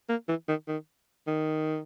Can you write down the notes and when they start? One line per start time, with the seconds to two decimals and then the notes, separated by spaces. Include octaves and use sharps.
0.09 A#3
0.28 E3
0.48 D#3
0.68 D#3
1.27 D#3